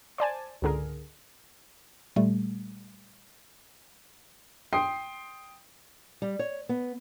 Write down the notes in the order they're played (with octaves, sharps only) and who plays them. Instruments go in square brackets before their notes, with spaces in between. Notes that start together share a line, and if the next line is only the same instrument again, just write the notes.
[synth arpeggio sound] C5 D5 G#5 A5
C#2 G#2 D3 G#4 A#4
[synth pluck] A#2 G3 A3
[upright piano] G5 C6 D#6 C7
[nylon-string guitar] G3
C#5
B3